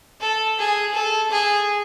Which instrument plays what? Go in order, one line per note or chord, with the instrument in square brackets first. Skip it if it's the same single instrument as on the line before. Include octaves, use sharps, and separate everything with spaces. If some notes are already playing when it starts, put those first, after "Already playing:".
[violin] A4
G#4
A4
G#4